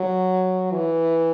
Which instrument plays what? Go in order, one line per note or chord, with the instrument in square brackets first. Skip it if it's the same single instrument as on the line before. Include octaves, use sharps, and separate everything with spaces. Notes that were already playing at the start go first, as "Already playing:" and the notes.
Already playing: [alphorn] F#3
E3